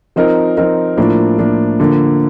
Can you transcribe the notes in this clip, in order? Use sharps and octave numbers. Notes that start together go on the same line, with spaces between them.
F3 C4 D#4 A#4
F3 C4 D#4 A#4
A2 F3 A#3 D4
A2 F3 A#3 D4
D3 F3 A#3